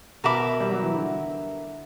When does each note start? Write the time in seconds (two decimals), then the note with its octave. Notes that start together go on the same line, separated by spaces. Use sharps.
0.24 B2 A#4 E5 B5 D6
0.60 G3
0.72 F#3
0.83 E3
0.94 D3